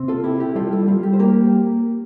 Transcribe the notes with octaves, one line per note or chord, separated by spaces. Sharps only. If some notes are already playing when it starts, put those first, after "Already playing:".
Already playing: C3 C4
F4 A4
E4 G4
G4
G3 F4 A4
F4 A4
G3 F4
G4
C5
A#3 G4 A#4